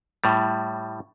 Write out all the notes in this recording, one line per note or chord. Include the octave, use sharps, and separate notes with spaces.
A2 G3